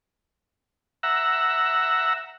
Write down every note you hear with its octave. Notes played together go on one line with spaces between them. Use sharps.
E5 F#5 A#5